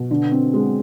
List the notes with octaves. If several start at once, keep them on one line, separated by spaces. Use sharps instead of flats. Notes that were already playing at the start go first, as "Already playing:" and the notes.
Already playing: B2
D3
C4
G#3